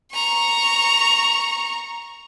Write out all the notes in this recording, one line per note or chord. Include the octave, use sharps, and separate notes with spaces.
A#5 C#6